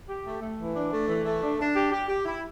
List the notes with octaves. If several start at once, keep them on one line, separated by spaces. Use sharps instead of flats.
G4
A3
A3
E3
D4
A3
E3
A3
D4
D4
G4
G4
G4
E4